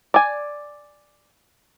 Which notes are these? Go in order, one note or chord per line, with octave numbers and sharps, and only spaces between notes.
D5 G#5